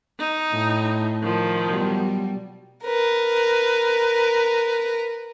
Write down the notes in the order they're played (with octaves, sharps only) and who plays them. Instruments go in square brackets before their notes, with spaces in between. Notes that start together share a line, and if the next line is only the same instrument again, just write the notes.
[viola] D#4
[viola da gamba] A2
[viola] D#3 F3
[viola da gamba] B2 F#3 G3
[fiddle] A#4 B4